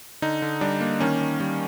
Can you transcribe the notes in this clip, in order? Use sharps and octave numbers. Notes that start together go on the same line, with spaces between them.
D3 D#4
D3
G3 D4
A#3
D#3 C#4
D#3
G3